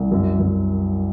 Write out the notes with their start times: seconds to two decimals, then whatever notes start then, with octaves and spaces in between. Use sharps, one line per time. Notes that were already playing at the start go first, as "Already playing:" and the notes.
Already playing: C2
0.11 F#2
0.39 F#2